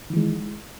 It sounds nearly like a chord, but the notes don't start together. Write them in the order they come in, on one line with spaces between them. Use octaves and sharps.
D#3 E3 G#3